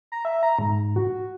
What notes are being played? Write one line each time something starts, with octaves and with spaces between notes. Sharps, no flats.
A#5
E5
A#5
G#2
F#4